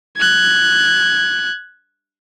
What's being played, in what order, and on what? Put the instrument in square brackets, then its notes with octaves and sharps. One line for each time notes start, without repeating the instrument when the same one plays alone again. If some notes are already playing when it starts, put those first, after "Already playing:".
[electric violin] F#6 G#6